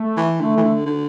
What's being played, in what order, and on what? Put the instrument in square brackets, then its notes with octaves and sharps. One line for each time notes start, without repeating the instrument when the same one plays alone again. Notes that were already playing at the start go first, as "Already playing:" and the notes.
Already playing: [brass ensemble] A3
[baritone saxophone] E3
[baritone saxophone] D3 [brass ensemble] A3
[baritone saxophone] E3
D3
D3